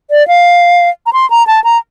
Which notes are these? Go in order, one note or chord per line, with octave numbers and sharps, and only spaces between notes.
D5
F5
A#5
C6
A#5
A5
A#5